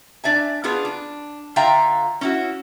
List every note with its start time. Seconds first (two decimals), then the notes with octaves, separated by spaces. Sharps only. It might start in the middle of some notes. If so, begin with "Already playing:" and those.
0.24 D4 D5 E5 G#5
0.64 B3 D4 F4 G#4 B4
0.85 D4
1.56 D3 F4 E5 F5 G5 A#5
2.21 C#4 E4 F#4